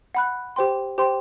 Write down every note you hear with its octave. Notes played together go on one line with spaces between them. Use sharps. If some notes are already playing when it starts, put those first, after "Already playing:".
F#5 B5 F#6
G4 C5 G5 C6
G4 C5 G5 C6